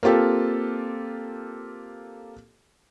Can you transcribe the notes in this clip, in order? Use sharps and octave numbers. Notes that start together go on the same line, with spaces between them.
A#3 C4 F4 G4 A4